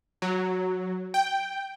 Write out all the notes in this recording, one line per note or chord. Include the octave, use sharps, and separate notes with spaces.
F#3
G5